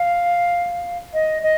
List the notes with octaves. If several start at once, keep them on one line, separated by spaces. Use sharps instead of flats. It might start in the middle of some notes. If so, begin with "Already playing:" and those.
Already playing: F5
D#5
D#5